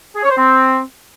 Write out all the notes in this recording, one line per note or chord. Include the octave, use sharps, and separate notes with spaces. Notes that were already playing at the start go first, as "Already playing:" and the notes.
G#4
C#5
C5
C4